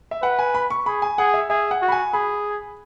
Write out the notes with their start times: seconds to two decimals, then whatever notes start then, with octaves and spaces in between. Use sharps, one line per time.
0.11 E5
0.22 B4 F#5
0.39 G#5
0.55 B5
0.70 C#6
0.86 G#4 B5
1.02 G#5
1.18 G#4 F#5
1.34 E5
1.50 G#4 E5
1.71 F#5
1.82 F#4
1.88 B5
1.92 G#5
2.13 G#4 B5